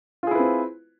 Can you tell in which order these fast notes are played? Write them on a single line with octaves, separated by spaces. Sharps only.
F4 G#4 E4 B4 C4